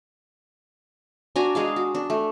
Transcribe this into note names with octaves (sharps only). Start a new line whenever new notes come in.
D4 F#4 G#5 A#5
G#3 G#4 F5
F#4
D4
A3